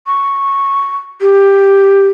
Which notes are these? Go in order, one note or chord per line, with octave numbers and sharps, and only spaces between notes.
C#6
G4